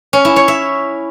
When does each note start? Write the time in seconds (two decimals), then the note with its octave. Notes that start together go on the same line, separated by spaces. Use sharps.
0.13 C#4
0.25 E4
0.36 C#5
0.48 E5